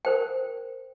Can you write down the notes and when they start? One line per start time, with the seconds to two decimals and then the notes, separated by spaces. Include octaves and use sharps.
0.05 A#4 C5 G5